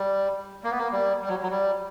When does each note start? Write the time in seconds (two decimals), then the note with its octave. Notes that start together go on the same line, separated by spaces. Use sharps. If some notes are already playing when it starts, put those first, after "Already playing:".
Already playing: G3
0.64 A#3
0.71 B3
0.78 A#3
0.92 G3
1.22 G3
1.28 F#3
1.43 F#3
1.51 G3